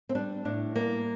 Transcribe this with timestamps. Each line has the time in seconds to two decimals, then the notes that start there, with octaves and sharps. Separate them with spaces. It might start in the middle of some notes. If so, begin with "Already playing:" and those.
0.09 C4
0.15 G3 D4
0.45 A2 D4
0.76 G3 A#3